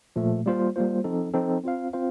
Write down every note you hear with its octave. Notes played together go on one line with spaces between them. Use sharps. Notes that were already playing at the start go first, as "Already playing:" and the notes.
A#2 F3 A3
G3 A#3 F4 C5
G3 A#3 F4 C5
F3 C4 D#4 A4
F3 C4 D#4 A4
C4 F4 C5 F5
C4 F4 C5 F5